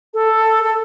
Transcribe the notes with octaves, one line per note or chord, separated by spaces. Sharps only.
A4
A4